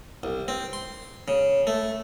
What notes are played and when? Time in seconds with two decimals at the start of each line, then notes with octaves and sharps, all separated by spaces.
0.23 C2
0.48 C4
0.73 C6
1.28 C#3
1.67 A3